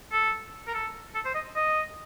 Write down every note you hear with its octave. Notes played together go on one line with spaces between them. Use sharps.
A4
A#4
A4
A4
C5
D#5
D#5